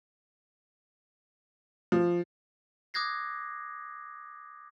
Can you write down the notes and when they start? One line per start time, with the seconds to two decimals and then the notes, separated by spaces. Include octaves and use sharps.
1.92 F3
2.94 D6 D#6 F#6 G#6 A#6 C7